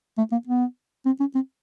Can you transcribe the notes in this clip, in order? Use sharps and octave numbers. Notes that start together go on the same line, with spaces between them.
A3
A#3
B3
C4
C#4
C4